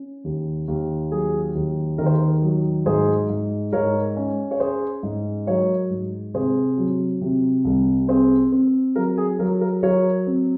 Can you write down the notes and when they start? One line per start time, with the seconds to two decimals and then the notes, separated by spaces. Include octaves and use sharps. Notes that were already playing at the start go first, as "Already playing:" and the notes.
Already playing: C#4
0.24 D#2
0.68 D#2
1.11 F#3 G#4
1.55 D#2
1.98 D#3 A#4
2.06 C5
2.15 A#4
2.42 F#3
2.86 G#2 G#4 C5
3.29 G#2
3.72 G#2 A#4 C#5
4.16 C#4
4.51 C#5
4.60 C#4 G#4 C5
5.03 G#2
5.47 F#3 A#4 C#5
5.90 G#2
6.34 C3 G#4 C5
6.78 F#3
7.21 C3
7.65 C2
8.08 C4 G#4 C5
8.52 C4
8.96 F#3 A#4
9.17 G#4
9.39 F#3 A#4
9.61 A#4
9.83 F#3 A#4 C#5
10.27 C4